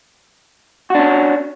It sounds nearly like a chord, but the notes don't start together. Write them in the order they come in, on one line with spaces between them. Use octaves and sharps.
F#4 D4 C#4